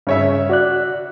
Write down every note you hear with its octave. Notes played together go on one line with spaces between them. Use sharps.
G2 C#3 C#5 E5
F#4 D5 F#6